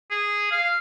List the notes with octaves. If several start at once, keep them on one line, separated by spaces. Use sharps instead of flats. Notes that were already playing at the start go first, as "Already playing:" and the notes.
G#4
F5